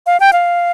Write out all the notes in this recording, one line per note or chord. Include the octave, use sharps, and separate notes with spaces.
F5
G5
F5